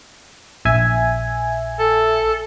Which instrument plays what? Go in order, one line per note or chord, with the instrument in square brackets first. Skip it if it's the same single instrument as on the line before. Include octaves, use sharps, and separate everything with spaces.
[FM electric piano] A#1 E5 G#5
[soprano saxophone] A4